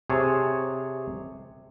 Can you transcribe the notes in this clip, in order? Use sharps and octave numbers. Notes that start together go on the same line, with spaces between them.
C3 G#4 C#5 A5